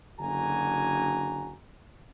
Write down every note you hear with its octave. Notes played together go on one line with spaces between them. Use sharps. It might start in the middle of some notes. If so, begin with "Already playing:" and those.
F#1 D3 D4 F#4 G#5 A#5